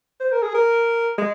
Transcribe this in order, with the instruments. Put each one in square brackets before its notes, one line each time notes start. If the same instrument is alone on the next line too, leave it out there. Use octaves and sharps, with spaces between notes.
[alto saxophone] C5
A#4
G#4
A#4
G#3